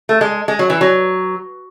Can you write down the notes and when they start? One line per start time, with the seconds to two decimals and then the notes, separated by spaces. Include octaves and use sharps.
0.09 A3
0.21 G#3
0.48 G#3
0.59 F#3
0.70 E3
0.81 F#3